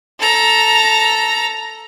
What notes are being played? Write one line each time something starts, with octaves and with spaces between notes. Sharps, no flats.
A4 A#5